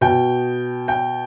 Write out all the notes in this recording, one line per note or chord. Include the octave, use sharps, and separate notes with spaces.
B2 G5
G5